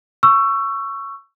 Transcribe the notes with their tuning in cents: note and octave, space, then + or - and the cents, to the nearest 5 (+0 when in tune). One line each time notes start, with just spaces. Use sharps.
C#6 +0 E6 +25